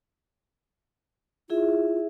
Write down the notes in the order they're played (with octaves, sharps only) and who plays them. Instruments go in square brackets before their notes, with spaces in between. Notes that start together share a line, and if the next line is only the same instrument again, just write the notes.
[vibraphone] E4 G#4 E5 [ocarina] F4